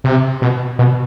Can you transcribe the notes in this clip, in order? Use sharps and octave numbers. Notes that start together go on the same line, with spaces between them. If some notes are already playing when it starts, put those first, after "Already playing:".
C3
B2
B2